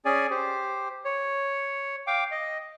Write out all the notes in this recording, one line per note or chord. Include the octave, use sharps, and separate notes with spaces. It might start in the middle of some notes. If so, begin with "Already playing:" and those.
C#4 G#4 D5 G#5
G4 C5
C#5
F5 G5 D6
D#5